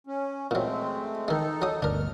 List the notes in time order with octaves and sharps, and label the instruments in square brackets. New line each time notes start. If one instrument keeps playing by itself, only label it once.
[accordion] C#4
[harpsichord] A#2 F#3 [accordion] G#3 A3 C4
[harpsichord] D#3 G#3 [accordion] D#4 A4
[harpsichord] F#3 D#6
[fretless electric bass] G1 D2 [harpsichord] D4 A#4 [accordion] F6